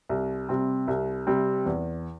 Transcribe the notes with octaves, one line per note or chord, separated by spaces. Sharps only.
C2
C3 G3 C4
C2
C3 G3 C4
E2